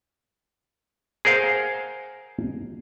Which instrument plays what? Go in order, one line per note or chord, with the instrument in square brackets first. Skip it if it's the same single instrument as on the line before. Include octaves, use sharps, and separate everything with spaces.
[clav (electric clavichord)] G#4 A#4 C5 F5 F#5